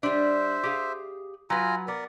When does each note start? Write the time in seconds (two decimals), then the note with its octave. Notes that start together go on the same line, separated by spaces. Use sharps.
0.03 G3 D4 C5 E5
0.63 G4 G#4 F5
1.50 F#3 F4 B4 G#5 A#5
1.88 B3 A#4 D5